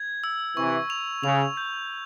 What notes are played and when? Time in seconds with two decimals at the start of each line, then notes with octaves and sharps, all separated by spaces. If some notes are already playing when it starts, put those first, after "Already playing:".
Already playing: G#6
0.24 E6
0.57 C3 E3 C#6
0.90 F7
1.23 C#3 F7
1.57 G6